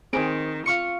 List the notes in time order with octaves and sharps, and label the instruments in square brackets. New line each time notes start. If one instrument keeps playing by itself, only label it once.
[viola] D#3 [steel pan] C4 G#4 [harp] D7
[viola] F4 [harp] F5 C#6 C#7